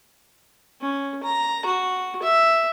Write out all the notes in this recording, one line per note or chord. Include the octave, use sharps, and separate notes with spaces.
C#4
A#5
F#4
E5